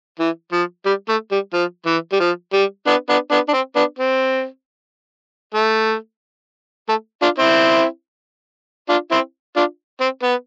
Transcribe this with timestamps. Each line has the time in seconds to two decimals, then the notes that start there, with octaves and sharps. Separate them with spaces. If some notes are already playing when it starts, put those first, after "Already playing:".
0.19 E3
0.52 F3
0.86 G3
1.09 A3
1.31 G3
1.53 F3
1.86 E3
2.12 G3
2.20 F3
2.53 G3
2.87 B3 D4
3.09 B3 D4
3.31 B3 D4
3.49 D4
3.53 C4
3.76 B3 D4
3.99 C4
5.54 A3
6.89 A3
7.22 D4 F4
7.39 C4 E4
8.89 D4 F4
9.11 C4 E4
9.56 D4 F4
10.01 C4
10.23 B3